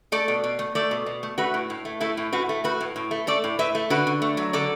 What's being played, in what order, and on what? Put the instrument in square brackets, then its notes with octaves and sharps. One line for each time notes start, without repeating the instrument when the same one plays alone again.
[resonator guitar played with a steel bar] A3 A4 D5
B2
B2
A3
A3 A4 D5
B2
B2
A3
A3 F#4 B4
A2
A2
A3
A3 E4 A4
A2
A2 F#4 B4
A3
A3 F#4 B4
A2
A2
A3
A3 A4 D5
A2
A2 B4 E5
A3
D3 F#4 B4
D3
A3
F#3
D3 A4 D5